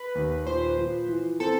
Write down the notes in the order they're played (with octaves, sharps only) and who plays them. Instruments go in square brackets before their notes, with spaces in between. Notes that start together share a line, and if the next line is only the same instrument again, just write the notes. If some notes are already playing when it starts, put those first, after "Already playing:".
Already playing: [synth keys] B4
[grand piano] D#2
[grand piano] A#2 [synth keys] C5
[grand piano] F3
E3
[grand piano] C4 [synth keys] A4